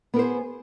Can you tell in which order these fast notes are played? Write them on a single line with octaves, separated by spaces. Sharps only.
B3 A#4 C5 G#4